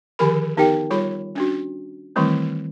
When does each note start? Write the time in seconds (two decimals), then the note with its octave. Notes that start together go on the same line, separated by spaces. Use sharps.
0.19 D3 D#3 F3 G4 A#4 B5
0.57 B3 D#4 G4 A#4 G5
0.90 G3 F4 G#4 C#5 B5
1.35 C#4 D4 F#4
2.16 D#3 E3 G3 A3 C4 E4